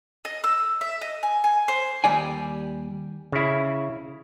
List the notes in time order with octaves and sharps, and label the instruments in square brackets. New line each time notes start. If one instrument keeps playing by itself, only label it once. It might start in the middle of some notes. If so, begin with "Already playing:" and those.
[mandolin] D#5
E6
E5
D#5
G#5
G#5
C5
[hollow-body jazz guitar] D#2 G3 D5 G#5
[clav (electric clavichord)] C#3 E4